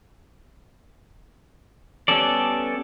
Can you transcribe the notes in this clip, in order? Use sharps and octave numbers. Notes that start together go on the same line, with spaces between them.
G3 B3 C#4 A4 D5